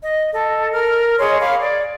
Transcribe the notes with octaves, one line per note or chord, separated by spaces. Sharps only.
D#5
A4 D#5
A#4 F6
G#4 C#5 D#5 C6
C#5 F5 B5 D6
D5